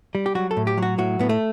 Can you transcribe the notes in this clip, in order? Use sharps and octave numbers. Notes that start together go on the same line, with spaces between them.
G3
G4
F#3 F#4
A4
A2
G4
F#3 F#4
A2 F#4
A2 B3
A3